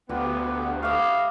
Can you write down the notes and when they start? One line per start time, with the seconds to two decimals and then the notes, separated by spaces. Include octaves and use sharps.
0.09 D2 B3 F4 G4
0.83 E4 F#4 D#5 F5 D6